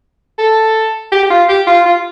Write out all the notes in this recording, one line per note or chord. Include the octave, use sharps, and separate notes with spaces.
A4
G4
G4
F4
G4
F4
F4